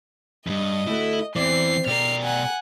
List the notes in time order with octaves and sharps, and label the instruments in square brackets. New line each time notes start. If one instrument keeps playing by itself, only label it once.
[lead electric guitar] E2 G2 [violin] D#5
[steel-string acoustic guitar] D2 A3 F#4 [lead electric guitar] E4
[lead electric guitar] E2 E3 [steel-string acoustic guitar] C4 C5 D5 [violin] C7
[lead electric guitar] B2 D5 [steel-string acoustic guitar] G4 A#4 [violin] F6 C7
[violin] F#5 G#5